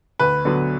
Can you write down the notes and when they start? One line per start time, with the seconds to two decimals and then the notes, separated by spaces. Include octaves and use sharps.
0.20 D2 B4
0.45 D3 F#3 B3